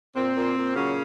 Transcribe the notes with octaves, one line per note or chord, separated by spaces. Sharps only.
A#2 C4
A#2
A#2
C#3 F#3 C#4